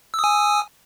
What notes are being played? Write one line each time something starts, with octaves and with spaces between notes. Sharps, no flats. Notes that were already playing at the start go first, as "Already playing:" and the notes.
G#5 D#6 E6